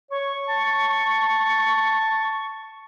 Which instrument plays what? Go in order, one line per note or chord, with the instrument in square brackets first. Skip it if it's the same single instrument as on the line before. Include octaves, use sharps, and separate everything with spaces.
[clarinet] C#5 [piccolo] C#6
[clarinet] A5